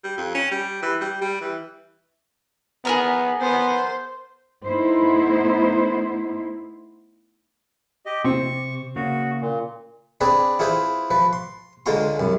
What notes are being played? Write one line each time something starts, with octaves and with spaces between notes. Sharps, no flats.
G3
F2
C#4
G3
E3
G3
G3
E3
B3 G#4 A#4 A#5
B3 C5
A3 B3 D#4 E4 C5
G4 D#5
C3 C4 C#6
C#3 A#3 F#4
A#2
C4 D4 G#4 B4 D5
E4 F4 G#4 B4 C5
F3 B4
C6
C#2 D3 G#3 F4 A#5 C6
C2 F#2